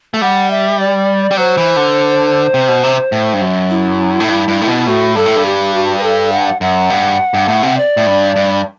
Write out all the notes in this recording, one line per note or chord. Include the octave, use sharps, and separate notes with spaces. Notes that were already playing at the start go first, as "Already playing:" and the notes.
A3
G3 F#5
E5
D5
G3
F#3 C5
E3
D3
C3
B2
C3
A2
G2
F#2
E4
A2
G2
G2
A2
B2
A2 F#4
G2 A4
A2
G2
G4
F#4
B4
A4
F#5
F#2 F#5
G2
G2
A2
C3
D5
A2
G2
G2